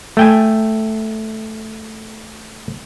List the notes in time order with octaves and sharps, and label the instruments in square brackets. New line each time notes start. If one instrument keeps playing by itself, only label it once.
[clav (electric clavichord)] A3 G5 G#5